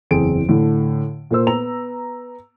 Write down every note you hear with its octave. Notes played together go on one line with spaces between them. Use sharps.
F#1 E2 C4 G#4 D7
A2 D3
A#2 A#3 C5 E6
B3 A#5 F7